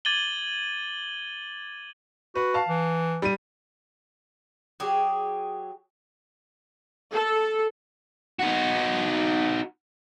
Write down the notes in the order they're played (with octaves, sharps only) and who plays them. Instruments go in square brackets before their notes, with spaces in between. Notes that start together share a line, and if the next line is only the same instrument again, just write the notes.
[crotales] D6 G#6 A6 D#7 F#7 G7
[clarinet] F#4 [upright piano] B4
[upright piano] F5 A5
[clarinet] E3
[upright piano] G3 D#7
[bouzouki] F#3 G4 G#4
[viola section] A4
[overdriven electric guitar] D#4 F#4